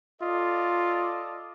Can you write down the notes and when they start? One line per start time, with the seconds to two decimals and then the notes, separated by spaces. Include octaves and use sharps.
0.22 F4 A4 D5 D#5